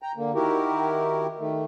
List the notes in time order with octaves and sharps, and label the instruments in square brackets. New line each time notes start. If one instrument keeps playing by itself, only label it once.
[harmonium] G5 A#5
D3 A#3
D#3 E4 F#4 G4 A#4
D#3 A3